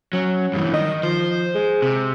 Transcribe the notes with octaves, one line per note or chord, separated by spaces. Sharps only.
F#3 C#4
G2 E3
D#3 D#5
F3 C5
G#3
C3